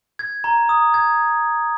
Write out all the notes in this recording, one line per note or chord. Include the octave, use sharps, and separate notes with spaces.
G#6
A#5
D#6
G#6